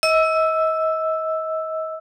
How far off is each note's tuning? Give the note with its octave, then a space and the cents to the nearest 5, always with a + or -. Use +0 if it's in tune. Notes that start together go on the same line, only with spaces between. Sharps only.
D#5 +35 E6 +0